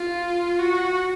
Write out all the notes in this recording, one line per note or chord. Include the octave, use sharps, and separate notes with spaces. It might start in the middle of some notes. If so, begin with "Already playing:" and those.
Already playing: F4
F#4